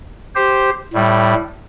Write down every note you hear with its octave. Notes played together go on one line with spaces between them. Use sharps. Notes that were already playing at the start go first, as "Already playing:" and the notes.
G4 C5
A2 G3